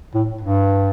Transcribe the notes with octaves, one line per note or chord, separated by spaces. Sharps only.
A2
G2